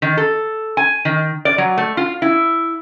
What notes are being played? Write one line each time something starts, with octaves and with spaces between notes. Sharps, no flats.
D#3
A4
G#5
D#3
D5
F#3
A3
F4
E4